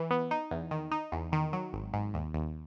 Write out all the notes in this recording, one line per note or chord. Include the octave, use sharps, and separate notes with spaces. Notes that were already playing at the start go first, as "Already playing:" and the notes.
Already playing: E3
B3
D#4
E2
D#3
D#4
E2
D#3
F#3
G#1
G#2
D#2
D#2